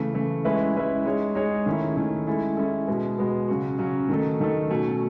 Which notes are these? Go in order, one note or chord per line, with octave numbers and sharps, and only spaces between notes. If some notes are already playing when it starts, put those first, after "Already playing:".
Already playing: C#3 E3 A3
C#3 E3 A3
G#3 C#4 E4 B4 E5
G#3 C#4 E4 B4 E5
G#3 D#4 G#4 C#5
G#3 D#4 G#4 C#5
D#3 A3 C#4 E4
D#3 A3 C#4 E4
G#3 C#4 E4 A4
G#3 C#4 E4 A4
B2 G#3 B3
B2 G#3 B3
C#3 F#3 C#4 F#4
C#3 F#3 C#4 F#4
D#3 A3 D#4 A4
D#3 A3 D#4 A4
B2 F#3 A3 C#4